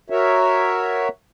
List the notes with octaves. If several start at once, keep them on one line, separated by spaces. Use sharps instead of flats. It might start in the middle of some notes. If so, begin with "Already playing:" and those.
F#4 A#4 C#5 E5